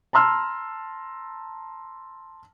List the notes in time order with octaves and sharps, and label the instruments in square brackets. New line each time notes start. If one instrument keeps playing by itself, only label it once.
[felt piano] A5 A#5 C6 E6 F6